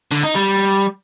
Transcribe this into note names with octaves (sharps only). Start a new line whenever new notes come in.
D3
D#4
G3